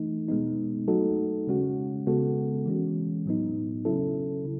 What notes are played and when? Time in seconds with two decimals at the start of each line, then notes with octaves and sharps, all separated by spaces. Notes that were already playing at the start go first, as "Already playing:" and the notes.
Already playing: E3 A3 D#4
0.29 B2 G#3 B3 D#4
0.88 F#3 A3 D#4 F#4 A4
1.47 C#3 G#3 C#4 F#4
2.07 C#3 G#3 B3 F#4 A4
2.66 E3 G#3 C#4
3.26 A2 F#3 B3 D#4
3.85 C#3 F#3 C#4 E4 A4
4.45 C#3